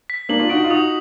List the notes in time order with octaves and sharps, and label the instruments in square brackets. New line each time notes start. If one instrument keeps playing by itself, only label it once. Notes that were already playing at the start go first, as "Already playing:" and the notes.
[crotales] B6
[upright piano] A#3 D4 [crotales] F#7
[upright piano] D4 F4
[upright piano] D#4 F#4 [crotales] D7
[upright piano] F4
[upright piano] D#4 F#4 [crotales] D#6